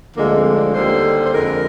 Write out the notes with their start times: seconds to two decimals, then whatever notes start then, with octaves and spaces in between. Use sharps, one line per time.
0.15 D2 D3 F3 G#3 A#3
0.35 C4
0.55 D4
0.74 D#2 D3 G3 C5
1.25 C5
1.33 F2 D3 G#3 A#4